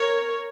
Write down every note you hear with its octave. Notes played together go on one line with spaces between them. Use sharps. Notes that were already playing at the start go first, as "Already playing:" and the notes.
Already playing: A#4 C#5